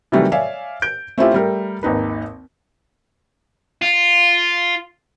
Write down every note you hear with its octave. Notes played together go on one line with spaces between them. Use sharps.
C3 D#3 E3 F#3 G3 A3
C#5 D5 E5 F5 G#5
G6 D7
A3 C4 C#4 E4 F4 G4
G3 A3 A#4
G#1 D#2 D#4 B4
F4